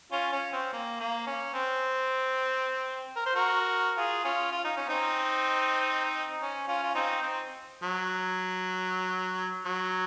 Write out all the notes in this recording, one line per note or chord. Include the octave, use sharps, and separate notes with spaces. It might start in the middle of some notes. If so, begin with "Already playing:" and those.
C#4 F4
C#4
C4
A#3
A#3
C#4
C4
A#4
C5
F#4 A#4
F4 G#4
C#4 F4
F4
D#4
C#4
C4 D#4
C#4
C#4 F4
F4
C4 D#4
C4
F#3
F#3